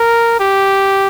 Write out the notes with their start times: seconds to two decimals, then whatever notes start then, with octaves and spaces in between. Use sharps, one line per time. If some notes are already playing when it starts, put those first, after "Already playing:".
Already playing: A#4
0.40 G4